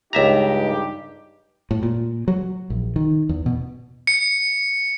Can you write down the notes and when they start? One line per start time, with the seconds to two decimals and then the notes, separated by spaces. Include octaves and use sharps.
0.13 C#2 G2 D#4 G4 E5 A#5
1.71 A2
1.83 A#2
2.28 F#3
2.70 A#1
2.96 D#3
3.29 E2
3.46 B2
4.07 C#7